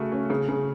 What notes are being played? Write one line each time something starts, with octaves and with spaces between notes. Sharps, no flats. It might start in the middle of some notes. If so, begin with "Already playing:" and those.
Already playing: C#3 A3 F#4
C#4
C#3
C#3